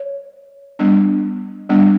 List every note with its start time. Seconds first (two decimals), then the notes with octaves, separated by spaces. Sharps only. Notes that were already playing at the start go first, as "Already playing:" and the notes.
Already playing: C#5
0.79 G3 B3 D4
1.69 G3 B3 D4